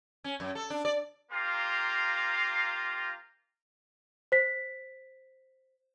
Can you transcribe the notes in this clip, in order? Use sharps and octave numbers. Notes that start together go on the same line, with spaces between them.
C#4
F#2
A4
D4
D5
A#3 F4 G4 C5 F5 A#5
C5 B6